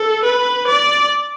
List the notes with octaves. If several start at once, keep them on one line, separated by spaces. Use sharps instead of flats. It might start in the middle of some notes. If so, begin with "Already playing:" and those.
Already playing: A4
B4
D5